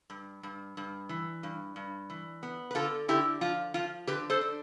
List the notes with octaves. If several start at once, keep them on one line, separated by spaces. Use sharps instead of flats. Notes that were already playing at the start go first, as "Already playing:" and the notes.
G2
G2
G2
E3
G2
G2
E3
B3
B4
D3 F4 A4
D3 E4 G4
F3 F4
F3 F4
D3 G4 B4
A4 C5
D4